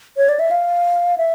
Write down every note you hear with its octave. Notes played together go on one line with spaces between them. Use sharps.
C#5
D5
E5
F5
E5